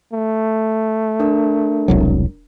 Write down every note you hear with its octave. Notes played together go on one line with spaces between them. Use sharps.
A3
D4 A#4
E1 C2 F#3